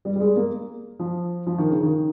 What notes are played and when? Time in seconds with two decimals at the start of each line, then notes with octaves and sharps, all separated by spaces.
0.05 G3
0.16 G3
0.20 G#3
0.36 A#3
0.99 F3
1.47 F3
1.58 D#3
1.70 C#3
1.83 D#3